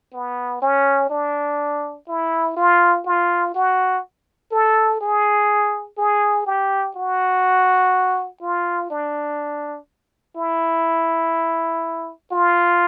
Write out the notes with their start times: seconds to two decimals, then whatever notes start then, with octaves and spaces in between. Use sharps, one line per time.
0.13 B3
0.62 C#4
1.10 D4
2.08 E4
2.56 F4
3.06 F4
3.54 F#4
4.52 A4
5.01 G#4
5.98 G#4
6.46 G4
6.96 F#4
8.41 F4
8.90 D4
10.36 E4
12.32 F4